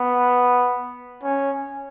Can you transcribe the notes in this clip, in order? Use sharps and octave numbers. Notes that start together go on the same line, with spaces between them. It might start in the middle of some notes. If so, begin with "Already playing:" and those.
Already playing: B3
C#4